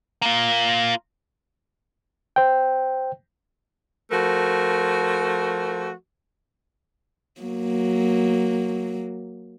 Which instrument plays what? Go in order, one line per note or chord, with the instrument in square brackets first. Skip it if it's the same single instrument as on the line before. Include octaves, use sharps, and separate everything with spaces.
[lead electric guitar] A#3 F4
[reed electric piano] C5 G5
[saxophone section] F3 A3 F#4 A#4
[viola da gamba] F#3 A#3